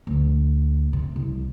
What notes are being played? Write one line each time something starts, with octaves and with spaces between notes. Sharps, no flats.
D2
C3
C2